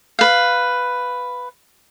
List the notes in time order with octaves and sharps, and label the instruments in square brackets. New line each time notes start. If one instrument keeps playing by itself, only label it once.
[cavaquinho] B4 F5